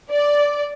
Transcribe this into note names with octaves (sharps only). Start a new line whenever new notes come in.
D5